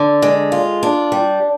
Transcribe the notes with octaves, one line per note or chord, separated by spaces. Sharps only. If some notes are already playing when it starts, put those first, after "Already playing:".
Already playing: D3 D4
G#3
F4
D4
G3